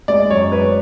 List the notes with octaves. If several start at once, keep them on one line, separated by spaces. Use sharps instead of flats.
G#3 D5
F#2 C#5
G#3 B4